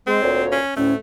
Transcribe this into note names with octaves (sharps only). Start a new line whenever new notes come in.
G#3 C4
D2 A#2 C#5
C#4
D2 A2 A3 C#4